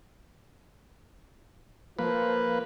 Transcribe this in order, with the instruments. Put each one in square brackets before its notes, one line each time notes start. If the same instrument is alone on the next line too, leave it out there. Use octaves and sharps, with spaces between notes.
[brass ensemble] F3 [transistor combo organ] A#3 B4